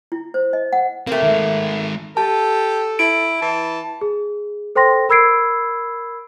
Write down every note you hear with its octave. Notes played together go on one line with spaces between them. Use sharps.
E4
C5
D#5
F#5
A3 A#3 C4 G4
D#3 G#3
G4 A4 A5
E4 D7
E3 A5
G#4
A4 C5 G5 C6 A#6
A#4 B5 E6 G#6 C7 D7